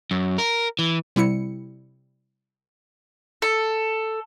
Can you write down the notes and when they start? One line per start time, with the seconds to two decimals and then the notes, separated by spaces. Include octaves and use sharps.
0.11 F#2
0.38 A#4
0.79 E3
1.16 C3 G3 E4 C#7
3.42 A4